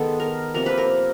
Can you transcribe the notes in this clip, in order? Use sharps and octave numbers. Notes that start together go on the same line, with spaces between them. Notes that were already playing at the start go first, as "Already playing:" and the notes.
Already playing: D#3 G#3 B3 A4
A#4
C3 F3 A#3 A#4
B4
A#4